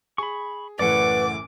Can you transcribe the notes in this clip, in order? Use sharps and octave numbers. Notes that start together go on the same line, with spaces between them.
G#4 B5 C#6
F#1 A2 E3 B4 D5 F#5 D6